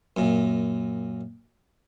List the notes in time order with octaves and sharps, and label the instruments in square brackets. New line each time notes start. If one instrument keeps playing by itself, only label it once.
[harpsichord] F#2 A#2